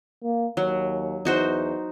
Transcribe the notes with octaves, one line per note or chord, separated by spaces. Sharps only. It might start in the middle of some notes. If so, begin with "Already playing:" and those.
A#3
D#2 F#3
E2 D#4 F#4 C5